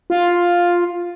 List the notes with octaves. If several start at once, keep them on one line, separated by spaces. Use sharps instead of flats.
F4